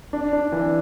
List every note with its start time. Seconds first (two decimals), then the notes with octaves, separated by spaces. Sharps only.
0.13 D4
0.33 D4
0.52 E3